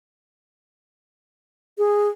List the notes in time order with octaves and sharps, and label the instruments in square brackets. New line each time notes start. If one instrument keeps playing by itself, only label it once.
[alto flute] G#4